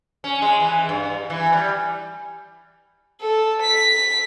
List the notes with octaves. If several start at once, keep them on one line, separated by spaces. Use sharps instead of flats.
C#4
G#3
E3
G2
E3
G3
A4
B6